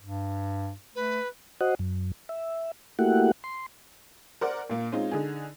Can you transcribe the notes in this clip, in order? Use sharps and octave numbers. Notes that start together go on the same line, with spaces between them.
G2
A3 B4
F#4 C5 D#5 F#5
F#2
E5
A3 A#3 E4 F#4 G4 F#5
C6
A#4 C5 D5 F#5
A#2 A#3
G#3 C4 C#4 D#4 F4
D3 D#4 G#4